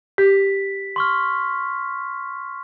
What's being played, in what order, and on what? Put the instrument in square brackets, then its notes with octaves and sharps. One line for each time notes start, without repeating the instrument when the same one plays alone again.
[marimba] G4 [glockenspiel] B6
[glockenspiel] C6 C#6 F6